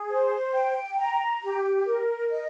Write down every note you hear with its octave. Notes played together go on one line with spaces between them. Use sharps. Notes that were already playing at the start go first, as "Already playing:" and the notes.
Already playing: G#4
C5
G5
A#5
G4
A#4
D#5